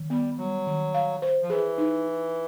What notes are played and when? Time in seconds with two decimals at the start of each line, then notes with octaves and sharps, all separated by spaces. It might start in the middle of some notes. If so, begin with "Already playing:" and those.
Already playing: D#3
0.10 G3 B3
0.38 F#3 G3
0.67 D#3
0.94 F5
1.22 C5
1.42 F3
1.50 E3 G#4
1.78 D#4
2.06 E4